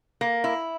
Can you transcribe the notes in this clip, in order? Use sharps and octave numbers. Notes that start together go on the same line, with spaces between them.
A#3
E4